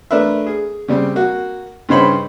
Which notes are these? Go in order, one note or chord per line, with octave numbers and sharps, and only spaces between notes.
A3 D4 A#4 B4 E5
G#4
C#3 G3 C4
A#3 F#4
G2 C#3 D#4 C5 C#5 B5